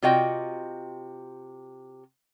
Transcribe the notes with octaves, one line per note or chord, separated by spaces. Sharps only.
C3 F4 F#4 D#5 G5